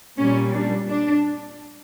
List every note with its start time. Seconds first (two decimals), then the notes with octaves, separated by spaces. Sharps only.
0.18 A#2 G3 C#4
0.54 D4
0.89 D4